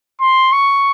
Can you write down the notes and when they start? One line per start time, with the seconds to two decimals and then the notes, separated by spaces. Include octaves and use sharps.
0.21 C6
0.53 C#6